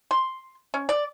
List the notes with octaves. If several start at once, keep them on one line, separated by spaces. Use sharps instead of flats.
C6
C#4
D5